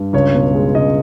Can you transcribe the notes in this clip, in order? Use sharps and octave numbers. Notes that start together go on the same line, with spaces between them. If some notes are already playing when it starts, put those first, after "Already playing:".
Already playing: G2
C#2 C#5
B2
G#3
C#2 D#5